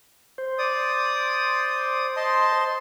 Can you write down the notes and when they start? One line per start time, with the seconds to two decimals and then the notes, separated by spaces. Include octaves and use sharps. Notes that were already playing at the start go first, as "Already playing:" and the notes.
0.38 C5
0.58 D5 D#6
2.16 D#5 A5 C6